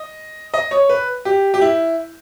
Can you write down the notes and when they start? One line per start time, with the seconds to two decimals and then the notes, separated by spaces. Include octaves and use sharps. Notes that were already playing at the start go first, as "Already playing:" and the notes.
Already playing: D#5
0.54 D#5
0.71 C#5
0.89 B4
1.25 G4
1.54 G4
1.61 E4